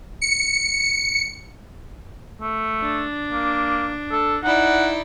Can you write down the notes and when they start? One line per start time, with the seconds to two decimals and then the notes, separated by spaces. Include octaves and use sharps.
0.21 C#7
2.41 A3
2.81 D4
3.31 A#3
4.11 A4
4.43 D#4 E4 D5 F#5